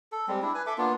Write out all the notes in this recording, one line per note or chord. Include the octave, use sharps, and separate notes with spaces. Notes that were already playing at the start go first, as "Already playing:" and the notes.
A4
G3 G#3 C4
D4 E4
B4 G#5
A4 E5 D6
A#3 B3 D4 F4